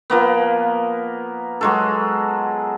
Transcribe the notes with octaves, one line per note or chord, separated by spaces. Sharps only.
F3 A#3 B3
F#3 G#3 A4